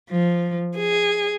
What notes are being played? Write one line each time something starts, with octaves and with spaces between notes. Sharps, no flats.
F3
G#4